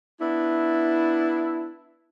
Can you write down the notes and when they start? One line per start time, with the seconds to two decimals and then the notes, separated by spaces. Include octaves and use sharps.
0.21 B3 D4 E4